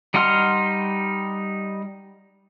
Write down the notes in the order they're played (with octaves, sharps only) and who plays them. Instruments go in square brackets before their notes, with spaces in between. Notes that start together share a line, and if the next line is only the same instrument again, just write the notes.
[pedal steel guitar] G3 D#4 F#5 C6 F6